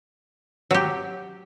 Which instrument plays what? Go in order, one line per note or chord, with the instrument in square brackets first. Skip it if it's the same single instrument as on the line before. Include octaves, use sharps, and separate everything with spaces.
[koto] F#3 G4